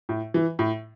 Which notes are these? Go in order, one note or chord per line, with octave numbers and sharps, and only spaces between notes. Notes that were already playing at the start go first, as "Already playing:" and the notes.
A2
E3
A2